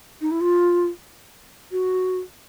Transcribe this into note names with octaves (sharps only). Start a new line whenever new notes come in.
D#4
E4
F4
F#4